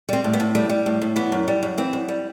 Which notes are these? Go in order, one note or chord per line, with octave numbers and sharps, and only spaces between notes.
G3 C4
A2
B3
A2
G3 A3
G3
A2
A2
E3 B3
F#2
G3
F#2
E3 C4
F#2
G3